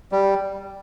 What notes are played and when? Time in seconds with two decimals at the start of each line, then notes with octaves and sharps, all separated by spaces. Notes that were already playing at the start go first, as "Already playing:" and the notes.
0.12 G3